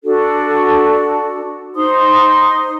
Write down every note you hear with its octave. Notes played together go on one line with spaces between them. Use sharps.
D4 F#4 A4
D#4 C5 C6 D#6